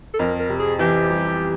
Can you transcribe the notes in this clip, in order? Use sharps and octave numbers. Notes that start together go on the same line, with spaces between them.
A4
F2 A#4
A#4
C3
G#4
E3 G4
G3